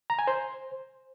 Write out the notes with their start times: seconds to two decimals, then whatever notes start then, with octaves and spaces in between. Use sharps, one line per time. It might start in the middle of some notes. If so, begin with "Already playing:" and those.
0.10 A#5
0.19 G#5
0.27 C5